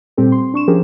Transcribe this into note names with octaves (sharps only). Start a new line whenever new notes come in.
A#2 G3 C4 G4 A4
C6
D4 C#6 E7
F3 C#4 G4 G#4 A#4